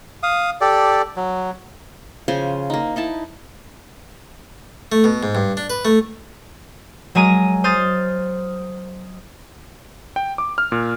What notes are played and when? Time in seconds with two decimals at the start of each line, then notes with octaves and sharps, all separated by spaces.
0.23 F5 D#6
0.61 G4 A4 D5
1.16 F#3
2.28 C#3 F3 C5 G#5
2.70 A#3 D#4
2.96 D#4 E4 A5
4.92 A3
5.04 B2
5.23 G#2
5.35 G2
5.57 D4
5.70 B4
5.85 A3
7.15 F#3 G#3 A#4 G#5 A#5 D#7
7.64 C5 D#6 F6 A6
10.16 G5
10.38 D6
10.58 F6
10.72 A#2